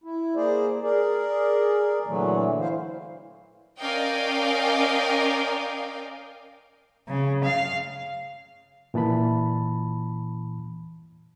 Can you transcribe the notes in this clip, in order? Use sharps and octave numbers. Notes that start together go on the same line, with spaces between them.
E4
A#3 G#4 C5 D5
G#4 A#4 D5
A#2 D3 E3 F#3 A3
E4 C5 F5
C#4 A#4 D5 D#5 F5 G5
C#3
F5
A#2 E3 A5 B5